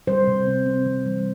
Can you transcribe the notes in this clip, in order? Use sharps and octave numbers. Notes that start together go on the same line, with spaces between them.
G3 C5
C3
C4
C4
E3
G3